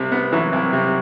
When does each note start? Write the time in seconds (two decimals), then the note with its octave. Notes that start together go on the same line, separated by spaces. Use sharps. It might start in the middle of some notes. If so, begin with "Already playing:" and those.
Already playing: C2 C3
0.12 B3
0.32 E3 F#3
0.52 C2
0.73 C3